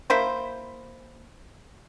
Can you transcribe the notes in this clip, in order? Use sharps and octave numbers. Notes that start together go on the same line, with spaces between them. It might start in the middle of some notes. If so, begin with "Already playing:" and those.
A#3 E4 C5